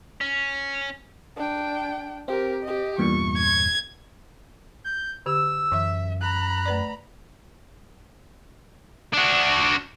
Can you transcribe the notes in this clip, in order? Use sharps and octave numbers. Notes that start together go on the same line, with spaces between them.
C#4
D4 G5
C4 G4 A#4
G4 D#5
E2 G2 A#2 C#6
G#6
G6
D3 G4 E6
F#2 E3 E5
A#5 B5 F#6
A3 B4 D5
D4 F#4